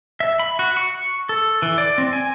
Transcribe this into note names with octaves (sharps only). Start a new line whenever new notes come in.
E5
B5
F#4
C#6
A4
E3
D5
C4
G#5